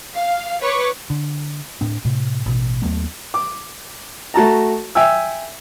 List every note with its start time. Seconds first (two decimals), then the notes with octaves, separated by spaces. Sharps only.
0.15 F5
0.61 B4 C#5 C#6 D6
1.10 D3
1.81 A2 C4 D4
2.05 A2 C3
2.46 A1 B2
2.82 D#2 F#3 A3 B3
3.34 D6
4.34 A3 F#4 A5 A#5
4.95 E5 G5 G#5 E6